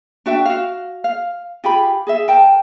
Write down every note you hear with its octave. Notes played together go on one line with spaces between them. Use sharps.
D4 F#4 E5 G5
F#4 F5
F5
F4 G4 G#4 B5
G#4 D#5 E5
A#4 G5 A5